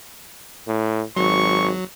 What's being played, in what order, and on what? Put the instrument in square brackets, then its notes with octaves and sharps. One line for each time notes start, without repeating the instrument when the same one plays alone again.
[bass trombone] A2
[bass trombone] G#1 [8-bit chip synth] F#3 [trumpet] C#6